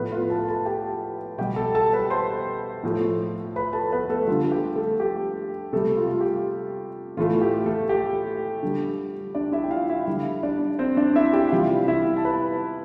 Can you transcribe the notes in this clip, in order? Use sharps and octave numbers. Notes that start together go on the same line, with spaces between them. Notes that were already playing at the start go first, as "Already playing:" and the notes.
Already playing: A2 F3 A3 B3 B4
F4 F5
A4 A5
A4 A5
G4 G5
B2 G3 G4 G5
A4 A5
A4 A5
B4 B5
C5 C6
A2 F3 A3
B4 B5
A4 A5
B3 B4
A3 A4
D3 G3 F4
G4
A3 A4
G4
C3 G3 A3 A4
F4
F4
G4
A2 E3 A3 F4
G4
A3 A4
G4
D3 G3
D4 D5
E4 E5
G5
F4 F5
E4 E5
D3 G3
D4 D5
C4 C5
D4 D5
E4 E5
G4 G5
C3 E3 G3 F4 F5
E4 E5
A5
B4 B5